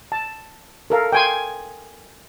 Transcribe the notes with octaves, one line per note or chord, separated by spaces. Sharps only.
A5
A4 A#4 F5
G5 G#5 C6